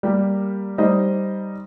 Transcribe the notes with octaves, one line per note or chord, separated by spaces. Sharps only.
G3 A#3 G4 A#4
G3 D#4 C5 D#5